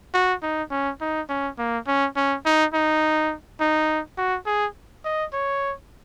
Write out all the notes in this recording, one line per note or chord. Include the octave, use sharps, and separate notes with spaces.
F#4
D#4
C#4
D#4
C#4
A#3
C#4
C#4
D#4
D#4
D#4
F#4
G#4
D#5
C#5